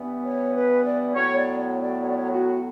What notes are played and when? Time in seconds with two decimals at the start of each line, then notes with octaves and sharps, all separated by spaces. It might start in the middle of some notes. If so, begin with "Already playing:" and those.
Already playing: G2 E3 B3
0.26 C#5
0.55 B4
0.86 D5
1.15 A2 F#3 B3 C#5
1.37 D5
1.60 C#5
1.81 D5
2.04 C#5
2.11 D5
2.18 C#5
2.33 F#4